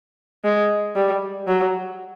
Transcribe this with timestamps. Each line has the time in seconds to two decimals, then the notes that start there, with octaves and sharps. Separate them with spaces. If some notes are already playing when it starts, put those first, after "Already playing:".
0.44 G#3
0.96 G3
1.47 F#3